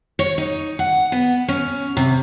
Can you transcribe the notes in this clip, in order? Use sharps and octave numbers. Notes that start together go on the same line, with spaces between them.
C#5
D#4
F#5
B3
C#4
C3